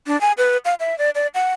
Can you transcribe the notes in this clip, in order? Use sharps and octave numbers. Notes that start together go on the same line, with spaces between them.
D4
G#5
B4
F5
E5
D5
D5
F#5